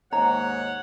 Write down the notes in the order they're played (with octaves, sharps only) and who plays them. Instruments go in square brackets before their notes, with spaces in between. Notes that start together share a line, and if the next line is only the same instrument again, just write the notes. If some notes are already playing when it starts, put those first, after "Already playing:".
[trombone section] D#2 G#2 [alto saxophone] C#5 [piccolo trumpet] F#5 [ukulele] A#5